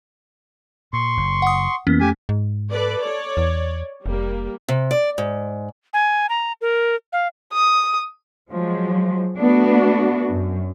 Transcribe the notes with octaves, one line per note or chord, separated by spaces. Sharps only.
A#2 C6 C#6
F#1
F#5 D#6
F2 E3 A#3 B3 C#4
A3 G4 G#5
G#2
A4 B4 D5
C#5 D5
E2
F1 G3 A#3
C3
D5
G#2
G#5
A#5
A#4
F5
D#6
F3 F#3 G#3
A3 B3 D4 F#4
F#2